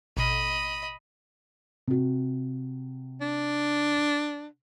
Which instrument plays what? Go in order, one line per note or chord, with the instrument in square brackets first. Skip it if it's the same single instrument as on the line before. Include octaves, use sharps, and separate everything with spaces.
[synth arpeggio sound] A1 B2 [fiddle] D#5 B5
[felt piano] C3 F#4
[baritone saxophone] D4